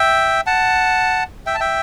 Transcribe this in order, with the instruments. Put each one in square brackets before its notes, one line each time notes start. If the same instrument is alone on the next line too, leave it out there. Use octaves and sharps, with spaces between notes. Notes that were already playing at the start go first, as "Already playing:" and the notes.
Already playing: [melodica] E5 G5
F#5 A5
E5 G5
A5
E5 G5